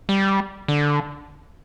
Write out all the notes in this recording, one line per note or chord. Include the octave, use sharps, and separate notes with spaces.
G3
D3